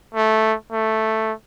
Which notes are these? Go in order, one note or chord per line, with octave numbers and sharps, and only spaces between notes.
A3
A3